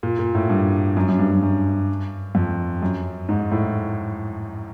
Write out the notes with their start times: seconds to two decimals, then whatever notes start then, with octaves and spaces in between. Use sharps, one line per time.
0.03 A#2
0.19 A#2
0.35 A2
0.49 G2
0.97 F#2
1.08 F#2
1.19 G2
1.31 F#2
1.42 F#2
2.35 F2
2.82 F#2
3.29 G#2
3.51 A2